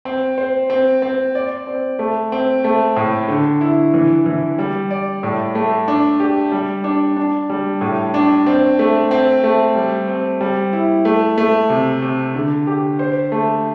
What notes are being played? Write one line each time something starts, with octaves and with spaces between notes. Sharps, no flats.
C4
C5
C4
C4
D5
C4
A3
C4
A3
A2
D3
E4
E3
E3
G3
D5
A2
A3
D4
G4
G3
D4
D4
G3
A2
D4
C4
A3
C4
A3
G3
C4
G3
E4
A3
A3
C3
C3
D3
G4
C5
A3